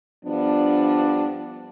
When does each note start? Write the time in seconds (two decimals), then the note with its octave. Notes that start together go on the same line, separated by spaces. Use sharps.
0.25 G2 F3 B3 D4